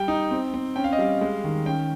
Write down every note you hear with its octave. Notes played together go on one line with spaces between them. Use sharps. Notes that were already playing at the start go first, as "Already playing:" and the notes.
Already playing: G3 G5
D#4
C4
C4
C#4 G5
F5
D#5
G3 F5
G#3
D#3
C#4 G5